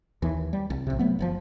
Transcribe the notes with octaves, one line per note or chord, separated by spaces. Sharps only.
D#2 E3
G3
C2
A1 C3
F#3 A3 B3
F#1 C3 F3